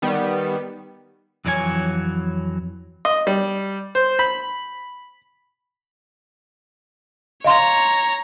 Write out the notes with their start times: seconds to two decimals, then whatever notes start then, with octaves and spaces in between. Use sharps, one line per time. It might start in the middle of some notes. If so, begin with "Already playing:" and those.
0.02 D#3 G3 B3
1.45 F2 E3 F#3 D4 C#5 G#5
3.05 D#5
3.27 G3
3.95 C5
4.19 B5
7.44 C#5 D#5 F5 A#5 C6